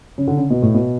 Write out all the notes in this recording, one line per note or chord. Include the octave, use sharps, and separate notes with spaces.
C#3
D3
C#3
B2
A2
B2